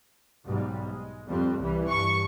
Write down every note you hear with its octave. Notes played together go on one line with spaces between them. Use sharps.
B1 G#2 G3
G#3
F2 G3 C4
C2 E3 G3
G2 C#6